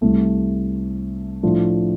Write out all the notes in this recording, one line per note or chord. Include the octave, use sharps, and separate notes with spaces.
C2 C3 A3
A2 F3 A3 D4 F4